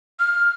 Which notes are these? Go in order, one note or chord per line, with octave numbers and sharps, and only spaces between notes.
F6